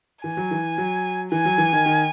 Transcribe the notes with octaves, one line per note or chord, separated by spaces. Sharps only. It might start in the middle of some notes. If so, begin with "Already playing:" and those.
E3 G#5
F#3
E3
F#3
E3 G#5
F#3
E3
D#3
D#3